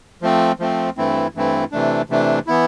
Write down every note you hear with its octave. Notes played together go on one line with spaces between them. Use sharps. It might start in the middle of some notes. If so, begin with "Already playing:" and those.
F3 A3 C4
F3 A3 C4
G2 E3 A3 C4 E4
G2 E3 A3 C4 E4
C3 E3 A3 D4
C3 E3 A3 D4
E3 B3 E4